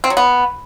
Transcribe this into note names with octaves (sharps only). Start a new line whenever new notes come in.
C4
F#3
B3